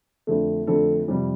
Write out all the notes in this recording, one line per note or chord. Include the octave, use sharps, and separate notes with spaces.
F2 D3 A3
F2 D3 A3 A4
F2 C3 G3